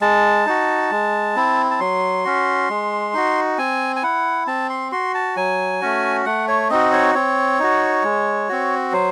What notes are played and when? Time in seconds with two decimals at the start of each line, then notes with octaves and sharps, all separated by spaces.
0.01 G#3 A5
0.46 D#4 F#4
0.91 G#3
1.36 C4 E4
1.71 A5
1.80 F#3 C6
2.25 C#4 F#4
2.70 G#3
3.14 D#4 F#4
3.58 C4 G#5
3.96 G#5
4.03 E4 F#5
4.47 C4 A5
4.70 C6
4.92 F#4 C6
5.15 A5
5.36 F#3 G#5
5.81 A3 C#4 F#4
6.26 A3 F#5
6.48 C#5
6.70 C4 D#4 F#4 D#5
6.93 C#5
7.15 C4 C#5
7.59 D#4 F#4
8.04 G#3
8.49 C4 F#4
8.92 F#3 C5